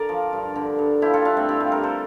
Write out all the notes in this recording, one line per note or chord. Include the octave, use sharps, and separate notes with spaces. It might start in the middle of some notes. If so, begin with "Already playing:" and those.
Already playing: D3 A#4 D5
F3
G2
D3
G2
F3 E4 G4
F4 A4
G2 D4 F4
A3 C4
G2 E4 G4
F4 A4
G2 G4 A#4
A4 C5